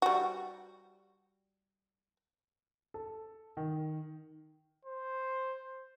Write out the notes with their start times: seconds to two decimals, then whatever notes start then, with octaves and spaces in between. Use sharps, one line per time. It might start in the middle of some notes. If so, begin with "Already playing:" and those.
0.02 G3 F#4
2.94 A4
3.57 D#3
4.85 C5